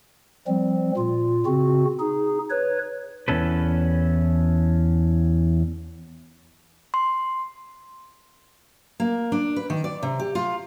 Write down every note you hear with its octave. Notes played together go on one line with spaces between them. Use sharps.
F3 G3 C4
A#2 F4
C#3 C4 F#4
D#4 G#4
B4 C#5
E2 B2 C#4 A4 B4
C6
A#3
D4
B4
D#3
D5
C3
G4
F4